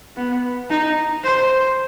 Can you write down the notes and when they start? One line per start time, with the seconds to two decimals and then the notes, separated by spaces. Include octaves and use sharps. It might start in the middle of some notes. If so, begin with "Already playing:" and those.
0.17 B3
0.70 D#4
1.24 C5